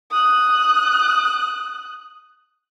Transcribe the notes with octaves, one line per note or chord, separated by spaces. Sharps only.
D#6 F#6